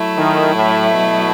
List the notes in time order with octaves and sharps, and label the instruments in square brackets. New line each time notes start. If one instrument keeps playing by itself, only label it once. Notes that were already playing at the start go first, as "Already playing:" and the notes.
Already playing: [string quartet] F#3 A3 E4
[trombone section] D#3
A2
B2